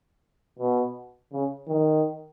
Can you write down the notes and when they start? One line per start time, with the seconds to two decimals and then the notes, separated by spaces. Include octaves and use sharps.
0.59 B2
1.32 C#3
1.69 D#3